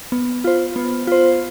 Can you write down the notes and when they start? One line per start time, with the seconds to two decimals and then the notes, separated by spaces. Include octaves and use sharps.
0.12 B3
0.44 F4 C5
0.76 B3
1.07 F4 C5